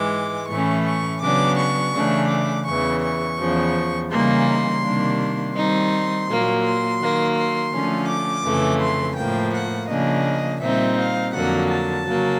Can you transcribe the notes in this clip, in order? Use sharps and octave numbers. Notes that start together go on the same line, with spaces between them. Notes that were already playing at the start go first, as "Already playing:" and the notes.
Already playing: G#2 E3 G#3 D6
A2 E3 A3 C#4 C#6
C#6
C#3 F#3 B3 D4 D6
C#6
C#3 E3 A3 D4
D6
E2 C#3 E3 C#6
C#6
E2 C#3 F3
C#3 E3 G3 A#3 D#4 C6
C3 D#3 G3 A#3 D4
D#3 G3 C4 D#4 C6
A#2 F#3 A#3
C6
D#3 F#3 A#3
C6
D3 F3 A3 C#4
D6
F2 C#3 E3 A3
C6
A2 F3 A#3 G5
F#5
C#3 F3 A#3 D4 D#5
A#2 G3 C4 D#4 E5
F5
F2 D3 F#3 A#3 F#5
A5
C#3 F#3 A#3